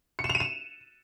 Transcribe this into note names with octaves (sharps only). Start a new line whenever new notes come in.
C#7
E7
F7
D#7
E7